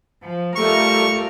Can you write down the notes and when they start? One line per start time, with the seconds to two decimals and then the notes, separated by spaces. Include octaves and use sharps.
0.23 F3
0.56 G3 A3 F4 G4 A#4 C#6